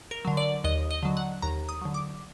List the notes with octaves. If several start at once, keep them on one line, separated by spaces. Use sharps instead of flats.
A#4
D3 F#3
D5
D#2 D#5
D#5
D3 F#3
F#5
D#2 A#5
D#6
D3 F#3
D6